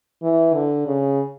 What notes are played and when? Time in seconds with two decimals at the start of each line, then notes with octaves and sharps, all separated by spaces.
0.23 E3
0.54 D3
0.86 C#3